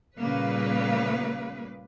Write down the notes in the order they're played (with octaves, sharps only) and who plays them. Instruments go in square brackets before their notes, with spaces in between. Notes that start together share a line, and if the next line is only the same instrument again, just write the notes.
[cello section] A#2 C#3 G3 A#3 B4